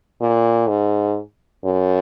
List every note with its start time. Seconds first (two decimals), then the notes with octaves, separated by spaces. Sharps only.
0.21 A#2
0.69 G#2
1.64 F#2